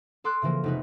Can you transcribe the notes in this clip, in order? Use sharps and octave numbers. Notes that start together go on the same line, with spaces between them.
A4 C6 D6 E6 F#6
C#3 E3 F3 A#3
F1 D#4 B4